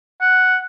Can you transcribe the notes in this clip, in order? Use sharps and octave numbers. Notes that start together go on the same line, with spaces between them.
F#5